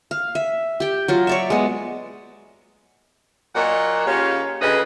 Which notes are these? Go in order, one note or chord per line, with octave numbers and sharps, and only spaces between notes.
F5
E5
G4 G5
F#3 F4
C#5 D5 E5
G#3 B3
A#2 F#3 A#3 C#5 D#5 F#5
C#3 A#3 C#4 F4 G4 C#5
D2 C#3 G#4 B4 D#5